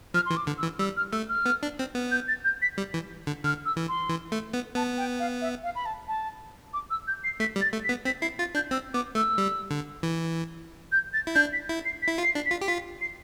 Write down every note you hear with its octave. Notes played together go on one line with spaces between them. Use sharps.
F3 F6
E3 C6
D6
D3
E6
E3
G3 E6
F6
A3 E6
F6
B3
D4
C4
B3
G6
A6
G6
B6
G3
E3
D3
D3 F6
E6
E3
C6
E3
A3
B3
B3 A5
G5
F5
E5
F5
B5
A5
A5
D6
E6
G6
C7
A3 B6
G3
A6
A3
B6
B3
C4 B6
E4 C7
F4 A6
D4 G6
C4 E6
B3 D6
A3 E6
G3
D3
E3
G6
A6
E4
D4 G6
B6
E4
C7
B6
E4
F4
C7
D4
B6
F4
G4
F4 B6
C7